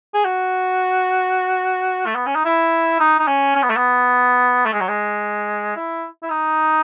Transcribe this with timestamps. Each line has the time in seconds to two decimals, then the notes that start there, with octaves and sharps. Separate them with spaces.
0.14 G#4
0.25 F#4
2.06 A3
2.15 B3
2.26 C#4
2.35 D#4
2.45 E4
3.00 D#4
3.19 D#4
3.27 C#4
3.55 C#4
3.63 B3
3.70 A3
3.77 B3
4.66 A3
4.73 G#3
4.80 F#3
4.88 G#3
5.76 E4
6.23 E4
6.30 D#4